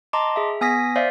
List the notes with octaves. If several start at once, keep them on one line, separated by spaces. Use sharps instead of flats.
D#5 A5 A#5 C6 D6
G#4 E5
B3 G#5 D#6 A#6 B6
C5 D5 E5 F5